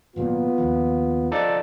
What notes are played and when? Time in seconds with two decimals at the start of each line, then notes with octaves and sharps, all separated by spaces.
0.16 G#1 A#2 F#3 B3 F4
0.58 D#2 F3
1.32 F3 D#4 A4 D5